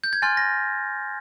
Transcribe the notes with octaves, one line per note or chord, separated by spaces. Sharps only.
G6
G#6
G#5 C6 F6 A6
A#6